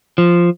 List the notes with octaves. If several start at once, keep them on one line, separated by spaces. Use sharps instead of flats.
F3